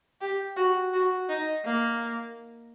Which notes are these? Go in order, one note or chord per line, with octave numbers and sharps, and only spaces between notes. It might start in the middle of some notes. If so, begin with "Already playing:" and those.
G4
F#4
F#4
D#4
A#3